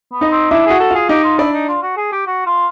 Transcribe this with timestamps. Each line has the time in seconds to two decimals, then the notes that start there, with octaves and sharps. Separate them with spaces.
0.12 B3
0.21 D#4 D#5
0.31 C4
0.50 D4 E4 E5
0.66 F#4 G#4 F#5
0.80 A4
0.90 F4 G#4 F5
1.09 D#4 G4 D#5
1.24 F4
1.38 D4 E4 D5
1.53 D#4
1.68 F4
1.83 F#4
1.97 G#4
2.12 G4
2.27 F#4
2.46 F4